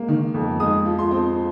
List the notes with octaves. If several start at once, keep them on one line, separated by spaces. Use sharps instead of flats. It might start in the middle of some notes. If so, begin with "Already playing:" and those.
Already playing: G#3 A#3
D#3
F2
G#3 D#6
F3
C6
C4